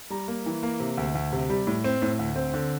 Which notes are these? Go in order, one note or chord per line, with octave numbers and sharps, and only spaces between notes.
G3 A#5
A#3
E3
A#3
C3
D2
D2
C3
G3
A2
C4
A2
D2
C4
D3